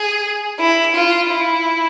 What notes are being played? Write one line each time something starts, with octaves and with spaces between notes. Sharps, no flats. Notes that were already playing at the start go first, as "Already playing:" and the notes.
Already playing: G#4
E4
F4
E4